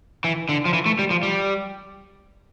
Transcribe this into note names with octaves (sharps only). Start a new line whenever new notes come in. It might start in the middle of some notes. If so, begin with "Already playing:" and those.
E3
D3
F3
E3
A3
G3
F3
G3